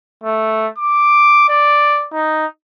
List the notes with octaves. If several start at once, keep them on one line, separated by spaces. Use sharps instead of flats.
A3
D6
D5
D#4